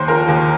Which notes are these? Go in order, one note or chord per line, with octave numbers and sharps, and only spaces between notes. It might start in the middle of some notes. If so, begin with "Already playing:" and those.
Already playing: D#2 C5
F3 A#4
D#2